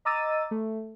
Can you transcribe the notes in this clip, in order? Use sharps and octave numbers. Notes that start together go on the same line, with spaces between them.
D#5 A#5 D6 E6 A6 D#7
A3